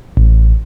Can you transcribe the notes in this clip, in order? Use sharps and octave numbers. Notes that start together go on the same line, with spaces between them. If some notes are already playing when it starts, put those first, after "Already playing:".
A1